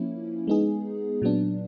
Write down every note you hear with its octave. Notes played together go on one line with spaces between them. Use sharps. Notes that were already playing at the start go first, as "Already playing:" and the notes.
Already playing: F3 A#3 C#4 E4
G#3 B3 D#4 G#4
A#2 F#3 B3 D4